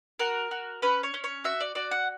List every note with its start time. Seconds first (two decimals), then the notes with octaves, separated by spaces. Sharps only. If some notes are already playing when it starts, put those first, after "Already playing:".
0.19 F#4 A#4
0.51 F#4
0.82 C#4 B4
1.03 C#5
1.14 C#4
1.24 C#5
1.44 F#4 E5
1.60 D5
1.75 F#4 D5
1.91 F#5